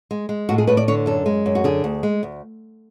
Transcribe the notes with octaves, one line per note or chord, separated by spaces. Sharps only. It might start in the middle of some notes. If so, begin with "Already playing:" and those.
G#3
G#3
A2 F#4
G#4
A2 B4
D5
D3 C#5
F#2 A4
G#3
F#2
F#4
D3 G#4
D2
G#3
D2